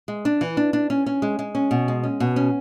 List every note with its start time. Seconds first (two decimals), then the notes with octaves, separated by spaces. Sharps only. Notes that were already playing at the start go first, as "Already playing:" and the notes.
0.08 G#3
0.25 D4
0.41 E3
0.57 D4
0.73 D4
0.90 C#4
1.06 C#4
1.22 G#3
1.39 G#3
1.55 C#4
1.71 B2
1.88 G#3
2.03 C#4
2.20 B2
2.36 C#4